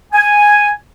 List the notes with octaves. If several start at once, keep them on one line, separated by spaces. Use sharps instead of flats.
G#5